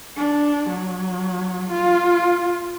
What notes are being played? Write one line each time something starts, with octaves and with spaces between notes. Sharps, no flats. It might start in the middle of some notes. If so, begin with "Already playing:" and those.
D4
F#3
F4